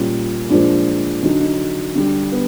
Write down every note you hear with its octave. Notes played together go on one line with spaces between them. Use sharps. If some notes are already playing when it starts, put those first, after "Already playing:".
Already playing: A#2 G3 C#4
A#2 F3 G#3 D4
D3 F#3 D#4
D#4
D3 G3
B3